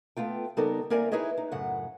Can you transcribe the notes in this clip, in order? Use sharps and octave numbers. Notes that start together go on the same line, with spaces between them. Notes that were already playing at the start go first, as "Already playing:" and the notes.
A3 B3 F4 G5
C#3 G3 B3 D#4 A4 A#4
A#3 C4 A#4 D5 E5 G#5
D#4 E4 G#4 B4 C#5 D#5
D#4
F#2 A2 C#3 F#5